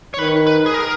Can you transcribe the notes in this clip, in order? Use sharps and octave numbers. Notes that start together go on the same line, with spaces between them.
C#5
D#3 B4
B4
G#4
A#4